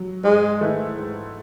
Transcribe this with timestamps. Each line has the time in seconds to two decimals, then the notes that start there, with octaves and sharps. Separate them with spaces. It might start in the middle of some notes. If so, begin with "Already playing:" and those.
Already playing: F#3
0.24 G#2 G#3
0.61 D#3 A3 E4 B4
0.98 G#2